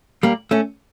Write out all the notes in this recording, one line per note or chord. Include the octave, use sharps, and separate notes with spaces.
G3 A#3
A3 C#4